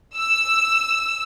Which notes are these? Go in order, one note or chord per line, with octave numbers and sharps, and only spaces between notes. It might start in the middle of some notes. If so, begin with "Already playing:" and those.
E6